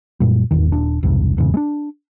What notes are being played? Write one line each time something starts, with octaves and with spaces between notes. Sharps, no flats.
F#2 A#2 G3
D#1 G#1 E2 D#3
D#1 D4
B1 E2 G2 C3
D#1 E2 G#2 C#3
G#3 D4